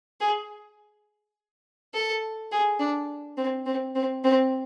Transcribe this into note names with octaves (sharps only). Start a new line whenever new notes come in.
G#4
A4
G#4
D4
C4
C4
C4
C4